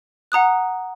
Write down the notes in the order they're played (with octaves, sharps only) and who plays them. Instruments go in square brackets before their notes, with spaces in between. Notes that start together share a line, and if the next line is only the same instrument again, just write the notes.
[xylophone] F#5 A#5 D#6 F#6